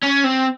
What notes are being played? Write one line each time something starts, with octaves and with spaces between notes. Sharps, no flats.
C#4
C4